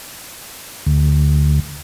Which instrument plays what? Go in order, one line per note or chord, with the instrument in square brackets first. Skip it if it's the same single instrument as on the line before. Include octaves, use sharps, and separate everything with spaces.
[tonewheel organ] D2